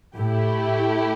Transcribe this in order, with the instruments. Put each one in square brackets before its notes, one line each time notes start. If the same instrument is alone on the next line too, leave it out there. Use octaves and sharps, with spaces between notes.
[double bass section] A2 [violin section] A3 E4 G4